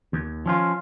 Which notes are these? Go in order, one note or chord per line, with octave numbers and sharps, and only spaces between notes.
D#2
F3 C#4 F4